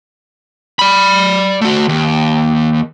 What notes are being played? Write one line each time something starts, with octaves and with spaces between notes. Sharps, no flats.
D5 B5
A3 F#4
D#2